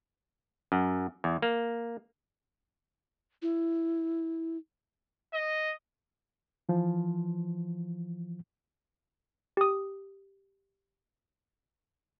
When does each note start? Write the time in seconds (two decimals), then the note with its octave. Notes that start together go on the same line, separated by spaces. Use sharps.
0.72 F#2
1.24 E2
1.42 A#3
3.42 E4
5.33 D#5
6.69 E3 F3
9.57 G4 D#6